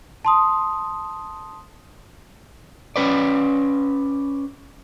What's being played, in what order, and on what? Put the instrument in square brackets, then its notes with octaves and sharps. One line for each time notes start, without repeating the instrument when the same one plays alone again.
[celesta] A5 C6 D#6
[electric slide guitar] C#4 B4 D5